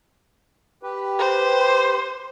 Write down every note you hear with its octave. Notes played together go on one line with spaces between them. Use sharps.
G4 B4
C5